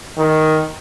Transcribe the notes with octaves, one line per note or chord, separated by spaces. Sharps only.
D#3